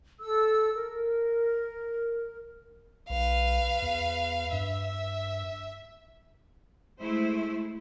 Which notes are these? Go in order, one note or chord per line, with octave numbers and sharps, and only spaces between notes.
A4 E6
A#4
B1 B4 F5
E2
G2 E5
G#3 A3 E4 C5